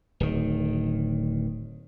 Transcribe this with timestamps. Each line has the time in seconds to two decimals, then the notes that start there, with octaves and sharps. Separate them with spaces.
0.20 D1 D#3